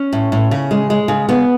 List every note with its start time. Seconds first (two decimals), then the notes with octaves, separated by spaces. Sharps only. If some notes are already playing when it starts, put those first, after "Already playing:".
Already playing: C#4
0.13 A2
0.32 A2
0.51 C#3
0.71 G#3
0.90 G#3
1.08 C#3
1.29 C#3 B3